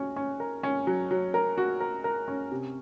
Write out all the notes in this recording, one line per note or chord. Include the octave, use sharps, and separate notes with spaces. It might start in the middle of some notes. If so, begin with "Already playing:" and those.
Already playing: C#4 F#4
C#4
A#4
C#4
F#3
F#3
A#4
F#4
A#4
A#4
C#4
C3